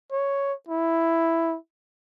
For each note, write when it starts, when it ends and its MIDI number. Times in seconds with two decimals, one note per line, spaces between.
0.12 0.54 73
0.69 1.56 64